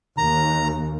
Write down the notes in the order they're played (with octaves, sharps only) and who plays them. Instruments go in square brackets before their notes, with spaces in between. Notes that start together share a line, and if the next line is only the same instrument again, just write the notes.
[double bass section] D#2 [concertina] A#5